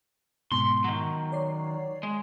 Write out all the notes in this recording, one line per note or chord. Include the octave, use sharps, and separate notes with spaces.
G#2 B2 A5 C6
D#3 F#3
C#5 D5 C7
G#3